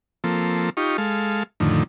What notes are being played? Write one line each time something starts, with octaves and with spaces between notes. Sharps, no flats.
F3 A#3 C4 A4
D#4 F4 G4 C#6
G#3 A4 F5
F2 A2 D3 D#3